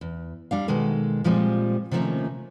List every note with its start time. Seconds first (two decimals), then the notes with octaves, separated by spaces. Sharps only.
0.01 E2
0.51 G3 D4 F5
0.68 B2 D#3 G#3 A4
1.24 A#2 F3 G3 G#3 C4
1.91 C3 D#3 F3 A3 A#3 C#4